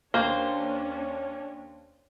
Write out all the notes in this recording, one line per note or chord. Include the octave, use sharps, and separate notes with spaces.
D#2 A#3 C#4 D4 C5 C#5 C6